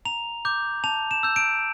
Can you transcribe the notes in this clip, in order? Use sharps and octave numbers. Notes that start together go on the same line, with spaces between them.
A#5 F7
D6 G6
A5 F7
E7
E6 G6
D7